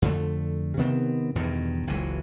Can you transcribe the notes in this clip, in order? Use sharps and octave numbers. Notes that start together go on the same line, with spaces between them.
F2 D3 A3
C3 D#3 B3 C4
E2 G2 B2 D#3
F#1 C#2 E3 F#3